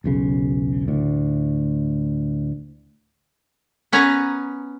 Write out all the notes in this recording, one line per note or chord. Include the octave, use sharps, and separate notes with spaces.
E1 B1 C#3
D2 A2
B3 C#4 B4 G#5 A#5